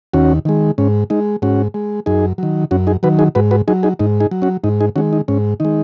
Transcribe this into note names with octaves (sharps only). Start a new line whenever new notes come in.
D#2 C#4 F#4
D#3 G#3
G#2 C#4
G#3 D#4
G#2 C#4 F#4
G#3
F#2 D#4 G#4
D#3 F#3
F#2 C#4 F#4
D#4 G#4
D#3 F#3 F#4 B4
D#4 G#4
G#2 F#4 B4
F#4 B4
F#3 D#4 G#4
D#4 G#4
G#2 D#4
D#4 G#4
F#3
C#4 F#4
G#2 D#4
D#4 G#4
D#3 G#3 C#4 F#4
D#4
G#2 C#4
D#3 G#3 D#4